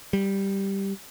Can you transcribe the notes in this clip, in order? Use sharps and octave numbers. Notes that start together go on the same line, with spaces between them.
G3